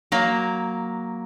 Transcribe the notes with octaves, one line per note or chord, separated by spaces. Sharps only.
F#3 A#3